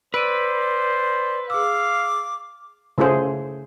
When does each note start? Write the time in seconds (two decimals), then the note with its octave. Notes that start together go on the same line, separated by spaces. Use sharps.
0.14 B4 C5 D5 E6 D7 D#7
1.50 G#4 F5 D6 E6
2.98 C#3 A3 F4 G#4 C5